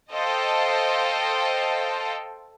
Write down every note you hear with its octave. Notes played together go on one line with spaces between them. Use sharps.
A4 C5 D#5 F5 G5 A5